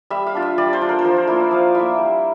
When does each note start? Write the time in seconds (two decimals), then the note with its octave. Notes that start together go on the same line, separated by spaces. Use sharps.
0.10 G3 E5
0.27 F5
0.35 D4 F4
0.42 E5
0.58 G3 D5
0.73 C5
0.81 D4 F4
0.89 A#4
0.99 C5
1.05 F3 A#4
1.16 C5
1.27 A#3 E4 A#4
1.40 D5
1.51 F3 F5
1.75 A#3 E4 E5
1.99 G3